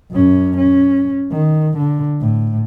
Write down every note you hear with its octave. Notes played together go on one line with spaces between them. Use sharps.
F#2 C#4
C#4
D#3
D3
A2